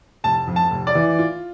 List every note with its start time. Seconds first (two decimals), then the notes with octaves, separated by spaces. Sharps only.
0.24 F1 A5
0.47 F2
0.56 A5
0.71 F1
0.87 D5
0.95 E3
1.19 F4